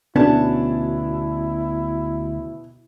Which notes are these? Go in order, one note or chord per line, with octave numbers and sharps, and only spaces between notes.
D2 B2 B3 C#4 D4 E4 A5